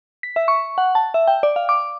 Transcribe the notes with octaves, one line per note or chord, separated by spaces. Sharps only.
B6
E5
C#6
F#5
A5
E5
G5
D5
F5
D6